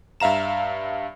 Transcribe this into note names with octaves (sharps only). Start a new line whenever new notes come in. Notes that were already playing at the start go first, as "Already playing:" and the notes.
G2 E5 F5 A#5 E7